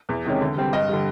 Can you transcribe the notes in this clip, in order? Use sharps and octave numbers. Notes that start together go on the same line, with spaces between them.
E2
C3 D#3 G#3 C#4
D3
G3 C4
G2 D#5
D3 G3